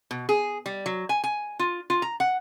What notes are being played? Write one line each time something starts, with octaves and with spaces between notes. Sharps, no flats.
B2
G#4
G3
F#3
G#5
G#5
F4
F4
A#5
F#5